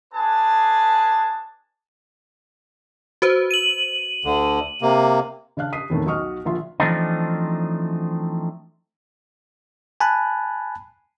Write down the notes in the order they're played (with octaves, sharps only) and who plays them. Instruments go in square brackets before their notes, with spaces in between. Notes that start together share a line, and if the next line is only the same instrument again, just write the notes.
[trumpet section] D4 G#4 B4 G#5 A5
[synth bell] F#4 B4 C5
D#7 F#7
[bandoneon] D2 D3
C3 A#3
[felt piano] C#3 D4 F5 F#6
D#6 B6 C7 D#7
E2 A2 C3 D#3 A3 C#4
B1 F#4 D#5 C#6 D#6 F6
A#1 D3 F4 E5 C6
[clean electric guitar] E3 F3 A3 C4 D4 D#4
[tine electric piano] G#5 A5 B5 F#6